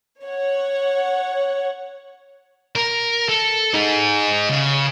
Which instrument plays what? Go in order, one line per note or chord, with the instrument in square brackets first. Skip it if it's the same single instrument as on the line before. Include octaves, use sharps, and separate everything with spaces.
[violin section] C#5 F#5
[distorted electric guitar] A#4
A4
D#4 G#4
C#3